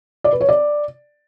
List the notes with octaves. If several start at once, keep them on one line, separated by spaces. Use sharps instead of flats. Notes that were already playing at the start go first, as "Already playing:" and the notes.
D5
B4
C#5
D5